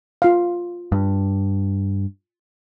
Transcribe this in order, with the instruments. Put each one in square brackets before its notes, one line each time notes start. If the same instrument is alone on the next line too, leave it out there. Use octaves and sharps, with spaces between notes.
[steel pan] F4 F5
[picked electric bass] G2